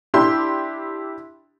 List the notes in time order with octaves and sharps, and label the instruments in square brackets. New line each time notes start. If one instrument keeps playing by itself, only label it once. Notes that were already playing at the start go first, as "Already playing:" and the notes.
[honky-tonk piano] D4 E4 G4 C6